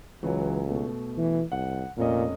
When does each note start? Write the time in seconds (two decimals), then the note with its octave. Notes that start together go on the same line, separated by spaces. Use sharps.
0.23 C#2 E3 F#3
0.67 B2 A3
1.18 E3
1.52 C2 F#5
1.98 F1 A#2 C#4 D#5